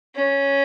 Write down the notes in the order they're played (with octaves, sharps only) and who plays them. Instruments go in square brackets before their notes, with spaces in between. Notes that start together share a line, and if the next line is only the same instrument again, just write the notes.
[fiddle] C#4